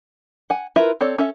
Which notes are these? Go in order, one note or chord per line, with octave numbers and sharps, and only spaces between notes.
F#5 G#5
E4 F4 A#4 B4 E5
C4 A4 C#5 D5
C#4 A4 E5